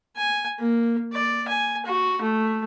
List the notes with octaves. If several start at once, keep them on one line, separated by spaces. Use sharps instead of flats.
G#5
A#3
D5
G#5
F#4
A3